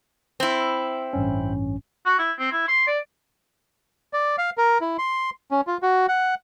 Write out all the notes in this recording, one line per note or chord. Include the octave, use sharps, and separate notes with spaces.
C4 E4
A1 G2 C#4
F#4
E4
C4
E4
C6
D5
D5
F5
A#4
E4
C6
C#4
F4
F#4
F#5